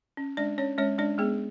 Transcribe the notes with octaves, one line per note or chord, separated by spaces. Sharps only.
C#4
G#3 D4 D5
C#4 C#5
G#3 C#4 C#5
G#3 D4 D5
G#3 B3 G#4